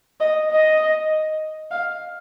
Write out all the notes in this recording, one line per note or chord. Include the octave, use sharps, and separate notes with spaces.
D#5
D#5
F5